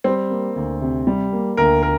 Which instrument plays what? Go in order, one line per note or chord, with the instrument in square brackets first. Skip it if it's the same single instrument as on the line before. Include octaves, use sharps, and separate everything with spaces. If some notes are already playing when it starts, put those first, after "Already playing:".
[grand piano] G3 [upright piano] C4
[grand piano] A#3
D2
C3
G3
A#3
[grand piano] D2 [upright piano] A#4
[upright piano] A#4